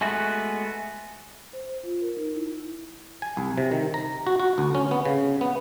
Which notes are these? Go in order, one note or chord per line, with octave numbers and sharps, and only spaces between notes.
G#3 A3 B3 F#4
C5
F4
A#4
D#4
E4
G#5
C2
C3
D#3
A#5
F#4
F#4
D2
C#4
B3
C#3
B3